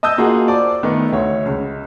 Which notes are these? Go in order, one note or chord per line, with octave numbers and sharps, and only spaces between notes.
D#5 A5 D#6 E6 G6
A#3 F4 F#4 G#4 A#4 F#5
C5 D5 A5 D6
D#3 A3 B3
D2 C#5
C#2